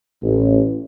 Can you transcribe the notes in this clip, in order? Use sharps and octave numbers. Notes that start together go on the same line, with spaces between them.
A1